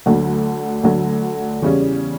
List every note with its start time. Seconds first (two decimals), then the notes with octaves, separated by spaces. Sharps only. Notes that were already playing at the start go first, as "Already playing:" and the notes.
0.06 D2 D3 F#3
0.83 D2 D3 F#3
1.62 E2 C#3 G3 C#4